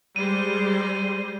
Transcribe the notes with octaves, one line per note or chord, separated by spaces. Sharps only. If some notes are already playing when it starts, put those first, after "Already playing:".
G3 G#3 C5 D#7